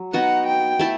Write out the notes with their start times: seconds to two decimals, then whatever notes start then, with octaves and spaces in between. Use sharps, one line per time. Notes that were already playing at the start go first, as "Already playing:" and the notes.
Already playing: F#3
0.13 B3 D#4 F#4 F#5
0.47 G5
0.79 A3 E4 A4